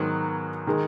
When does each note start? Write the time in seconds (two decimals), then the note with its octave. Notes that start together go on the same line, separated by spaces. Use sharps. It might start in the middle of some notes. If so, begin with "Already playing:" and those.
Already playing: G#2 D#3 F#3 B3
0.67 D#3 G#3